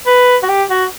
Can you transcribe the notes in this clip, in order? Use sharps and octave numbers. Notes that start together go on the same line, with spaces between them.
B4
F#4
G4
F#4